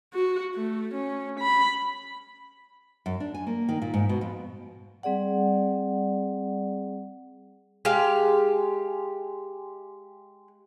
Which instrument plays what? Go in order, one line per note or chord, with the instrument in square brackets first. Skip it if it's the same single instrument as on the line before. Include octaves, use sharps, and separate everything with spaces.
[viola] F#4
A3
C#4
B5
[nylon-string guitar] F#2
D4
G#5
A#3
D#3
A#2
G#2
B2
F2
[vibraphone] G3 C4 G#4 D5 F#5
[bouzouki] G#3 G4 F5